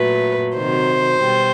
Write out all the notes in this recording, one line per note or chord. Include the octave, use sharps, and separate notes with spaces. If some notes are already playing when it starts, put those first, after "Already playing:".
Already playing: A#2 F#3 A3 B4
C3 D#3 F#3 C5
B2 G3